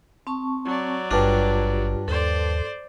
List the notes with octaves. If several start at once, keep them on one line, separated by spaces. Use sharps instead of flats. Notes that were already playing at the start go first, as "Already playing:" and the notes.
C4 A5 C#6
F#3 D5
G#1 G2 D4 F4 G4
D#2 A4 C5 D5 C6